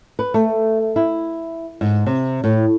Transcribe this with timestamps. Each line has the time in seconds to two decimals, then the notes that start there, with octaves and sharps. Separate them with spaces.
0.19 B4
0.34 A3
0.96 E4
1.81 G#2
2.06 C3
2.44 A2